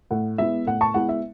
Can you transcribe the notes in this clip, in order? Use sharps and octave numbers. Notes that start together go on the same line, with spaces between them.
A2 F#5
G#3 B3 E4 E5
A2 F#5
A5 C#6
G#3 B3 E4 F#5
E5